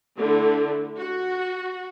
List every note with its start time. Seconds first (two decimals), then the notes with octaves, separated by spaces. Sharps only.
0.17 D3 A3 E4
0.98 F#4